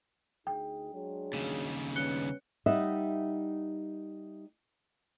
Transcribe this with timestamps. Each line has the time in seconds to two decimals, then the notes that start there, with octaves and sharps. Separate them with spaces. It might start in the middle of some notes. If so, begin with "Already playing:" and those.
0.47 D2 D#4 G#4 G5
0.93 F#3 G#3 D4
1.33 D#2 C#3
1.96 G3 B3 C#4 F#6 C#7 G7
2.66 G3 D#4 D#5 E5 F#5